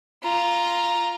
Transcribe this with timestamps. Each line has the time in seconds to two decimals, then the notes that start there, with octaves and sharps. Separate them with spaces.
0.23 F4 A#5